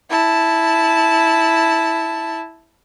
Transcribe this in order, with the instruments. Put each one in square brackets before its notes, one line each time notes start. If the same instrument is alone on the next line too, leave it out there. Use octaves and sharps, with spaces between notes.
[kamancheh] E4 A5